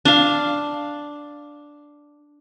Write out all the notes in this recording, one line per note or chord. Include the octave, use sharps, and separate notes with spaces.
D4 F5